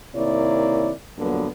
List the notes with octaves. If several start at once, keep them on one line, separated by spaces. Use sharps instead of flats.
C3 D#3 A#3 E4 C#5 D5
G2 A#2 D3 F#3 A#3 B3